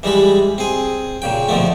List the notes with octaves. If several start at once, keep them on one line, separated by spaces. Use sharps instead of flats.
E3 G3 G#3 B5
C4 G#4
A#2 C#3 G5
D2 B2 D3 F3 A3